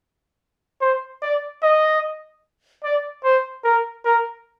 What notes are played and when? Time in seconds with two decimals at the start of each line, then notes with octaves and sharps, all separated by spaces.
0.81 C5
1.22 D5
1.63 D#5
2.84 D5
3.24 C5
3.64 A#4
4.05 A#4